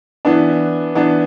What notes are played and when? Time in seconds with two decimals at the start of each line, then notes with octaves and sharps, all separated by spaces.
0.25 E3 B3 D4
0.95 E3 B3 D4